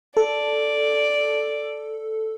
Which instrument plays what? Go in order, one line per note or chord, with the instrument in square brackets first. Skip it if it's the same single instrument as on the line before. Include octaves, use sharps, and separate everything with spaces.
[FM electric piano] A4 [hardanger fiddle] D5